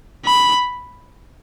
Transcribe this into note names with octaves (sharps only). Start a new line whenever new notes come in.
B5